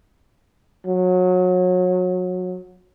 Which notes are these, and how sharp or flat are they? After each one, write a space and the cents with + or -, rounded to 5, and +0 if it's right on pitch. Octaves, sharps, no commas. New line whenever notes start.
F#3 -25